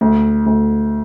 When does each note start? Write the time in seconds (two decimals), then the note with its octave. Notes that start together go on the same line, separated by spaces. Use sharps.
0.01 D2
0.46 D2